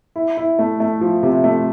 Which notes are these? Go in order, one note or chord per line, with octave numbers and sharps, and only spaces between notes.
E4
E4
A3
A3
F3
C3
A3